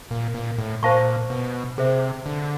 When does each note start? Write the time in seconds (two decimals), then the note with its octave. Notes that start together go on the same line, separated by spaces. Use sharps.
0.11 A#2
0.34 A#2
0.58 A2
0.83 A#2 C5 F5 A5 C#6
1.30 B2
1.78 C3 G#4 C5 E5
2.26 D3